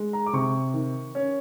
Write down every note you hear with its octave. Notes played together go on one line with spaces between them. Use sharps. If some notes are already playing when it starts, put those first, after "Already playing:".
Already playing: G#3
A#5
D6
C3 C#6
D#3
C#4